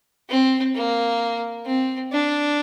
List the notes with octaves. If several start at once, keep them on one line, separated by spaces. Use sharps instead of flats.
C4
A#3
C4
D4